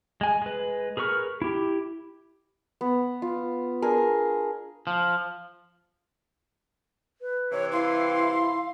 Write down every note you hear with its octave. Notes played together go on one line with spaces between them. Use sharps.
G#3 G#5
G#3 B4
G#4 A#4 B4 C#6 F6
E4 G4
B3
F4
D4 G#4 A#4
F3
B4
C3 E3 C#5
E4 F5 C6